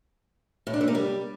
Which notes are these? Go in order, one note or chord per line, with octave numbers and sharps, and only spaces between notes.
A2
D4
A3
A#3
G3